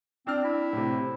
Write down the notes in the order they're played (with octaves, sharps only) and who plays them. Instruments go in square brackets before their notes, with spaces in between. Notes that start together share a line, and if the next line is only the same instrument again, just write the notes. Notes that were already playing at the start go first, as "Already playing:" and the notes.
[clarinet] C4 [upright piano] D4 F6
[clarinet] E4
[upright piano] A2 C3
C4